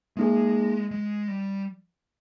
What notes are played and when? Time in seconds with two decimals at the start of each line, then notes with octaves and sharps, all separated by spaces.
0.17 G#3 A#3 D#4 G#4
0.91 G#3
1.28 G3